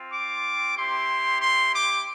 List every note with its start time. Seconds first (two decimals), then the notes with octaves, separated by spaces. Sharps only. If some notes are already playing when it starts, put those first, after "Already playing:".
Already playing: C4 F4
0.12 D6
0.76 C4 E4 G4 C6
1.41 C6
1.72 D6